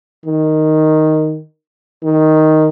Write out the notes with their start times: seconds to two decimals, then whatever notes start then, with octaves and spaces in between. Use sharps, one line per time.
0.26 D#3
2.03 D#3